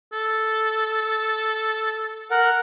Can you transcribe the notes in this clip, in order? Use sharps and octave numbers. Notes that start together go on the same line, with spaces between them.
A4
A#4 F#5